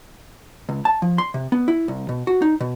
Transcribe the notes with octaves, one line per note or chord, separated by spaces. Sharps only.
C#2
A5
F3
C6
C3
B3
E4
C2
B2
F#4
D#4
B2